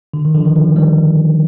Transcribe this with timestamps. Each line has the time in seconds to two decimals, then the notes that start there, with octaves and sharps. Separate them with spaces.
0.14 D3
0.25 D#3
0.35 D3 F3
0.46 D#3
0.56 D3 F3
0.76 D#3 G3